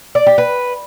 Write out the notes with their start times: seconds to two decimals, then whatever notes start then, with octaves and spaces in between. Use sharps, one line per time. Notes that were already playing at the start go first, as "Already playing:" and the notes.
0.15 D5
0.26 G4
0.38 B4